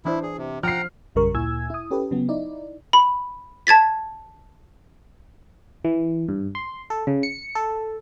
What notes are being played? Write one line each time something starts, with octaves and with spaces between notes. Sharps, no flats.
E3 D4 E4 C5
G#4
C3
F3 F#5 G5 A#5 F6 C7
A#1 F#2 C#3 G3 A#4 C#6
D2 A#2 E4 G#5 E6 G#6
E4 D#6
C#4 G4 A4 B4
C#3 F#3 B3
D#4 E4 D5
B5
A5 G#6 A6 B6
E3
G2
C6
A4
C#3
C#7
A4